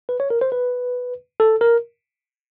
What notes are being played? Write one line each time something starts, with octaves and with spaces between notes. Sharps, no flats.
B4
C#5
A#4
C5
B4
A4
A#4